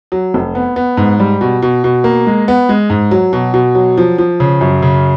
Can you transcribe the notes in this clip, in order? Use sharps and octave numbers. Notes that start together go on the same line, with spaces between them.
F#3
F1
B3
B3
G#2
G3
B2
B2
B2
A#3
G#3
B3
G#3
G#2
F#3
B2
B2
F#3
F3
F3
C#3
F#2
C#3